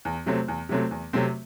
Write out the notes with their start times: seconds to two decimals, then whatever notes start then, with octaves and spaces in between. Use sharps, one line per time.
0.05 E2
0.26 C3 F#3 A3 C4
0.48 E2
0.69 C3 F#3 A3 C4
0.91 E2
1.13 C3 F#3 A3 C4